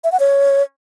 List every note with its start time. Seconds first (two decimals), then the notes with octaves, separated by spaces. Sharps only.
0.04 E5
0.12 F#5
0.20 C#5